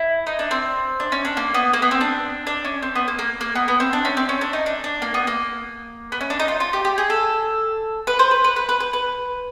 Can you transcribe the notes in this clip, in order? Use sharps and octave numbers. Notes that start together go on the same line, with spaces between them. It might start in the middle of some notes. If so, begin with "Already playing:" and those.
Already playing: E4
D#4
D4
C4
D4
C#4
D4
A#3
B3
A#3
B3
C4
D4
D4
C#4
C4
B3
A#3
A#3
A#3
B3
B3
C4
D4
C#4
C4
C#4
D4
D#4
D4
D4
A#3
B3
A#3
B3
C#4
D4
D#4
F4
F4
G4
G4
G#4
A4
B4
C5
B4
B4
B4
B4
B4
B4